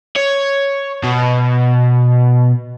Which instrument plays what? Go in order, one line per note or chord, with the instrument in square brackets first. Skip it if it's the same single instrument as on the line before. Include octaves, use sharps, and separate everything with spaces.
[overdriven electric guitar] C#5
B2